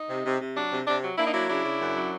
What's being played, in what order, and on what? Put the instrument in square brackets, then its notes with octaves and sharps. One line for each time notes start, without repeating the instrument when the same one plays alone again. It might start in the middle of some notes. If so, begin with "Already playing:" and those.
Already playing: [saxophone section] D#4
C3
C3
C3
F#3 D4
C3
C3 D4
F#3
A#3 D4 E4
D#4
F#3 D4 E4
C#3 D4 E4
C#3
F#2
F#3